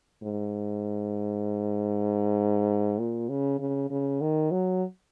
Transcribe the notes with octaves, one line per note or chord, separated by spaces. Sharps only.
G#2
A#2
C#3
C#3
C#3
D#3
F#3